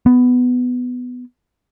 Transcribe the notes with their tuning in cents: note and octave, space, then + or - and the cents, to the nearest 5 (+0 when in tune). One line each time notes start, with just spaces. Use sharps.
B3 +10